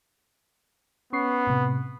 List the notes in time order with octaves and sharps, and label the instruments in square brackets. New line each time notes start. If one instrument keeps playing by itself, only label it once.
[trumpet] B3 [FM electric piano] C#4 C#6 C7
[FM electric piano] A2 C3